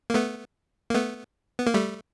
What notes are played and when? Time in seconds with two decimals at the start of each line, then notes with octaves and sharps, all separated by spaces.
0.10 A#3
0.14 A3 B3
0.90 A#3
0.94 A3 B3
1.58 B3
1.66 A#3
1.74 G3 A3